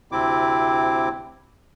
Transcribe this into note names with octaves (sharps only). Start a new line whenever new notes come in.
D2 C3 C4 E4 D6